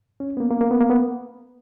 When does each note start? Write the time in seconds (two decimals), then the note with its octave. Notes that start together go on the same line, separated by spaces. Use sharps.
0.20 C#4
0.37 B3
0.40 A#3
0.51 A#3
0.61 A#3
0.71 B3
0.81 A#3
0.90 B3